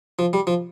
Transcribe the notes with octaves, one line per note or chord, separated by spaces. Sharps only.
F3
G3
F3